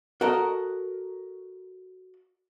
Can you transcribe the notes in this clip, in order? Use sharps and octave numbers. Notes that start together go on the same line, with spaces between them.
F#4 A4 A#4 D#5